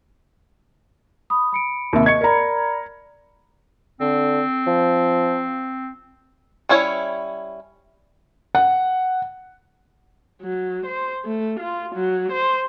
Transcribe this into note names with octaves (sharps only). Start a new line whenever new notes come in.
B5 D#6
B5 C#7 D7
D#2 C3 E5
D#5 C#6 G#6 C#7
A#4 D5 A#5 B5
D3 C4
F3
G3 C#4 E4 F#4 C#5
F#5
F#3
C5
A3
F4
F#3
C5